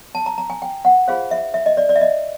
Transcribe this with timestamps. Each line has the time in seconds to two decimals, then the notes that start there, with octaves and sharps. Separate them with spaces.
0.15 A5
0.26 A#5
0.38 A#5
0.50 G#5
0.62 G5
0.85 F#5
1.08 F4 G#4 C5 F5
1.31 E5
1.54 E5
1.66 D#5
1.77 D5
1.89 D5
1.96 E5
2.01 D#5